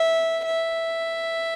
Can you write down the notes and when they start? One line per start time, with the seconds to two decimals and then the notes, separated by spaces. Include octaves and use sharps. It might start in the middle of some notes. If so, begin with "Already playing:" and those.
Already playing: E5
0.45 E5